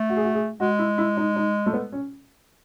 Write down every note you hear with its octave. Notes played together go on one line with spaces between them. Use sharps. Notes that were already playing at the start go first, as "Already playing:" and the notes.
Already playing: A3
F#4
G#4
F#4
G#4
G#3 F#4
E4
E4
D#4
D#4
A3
B3
C#4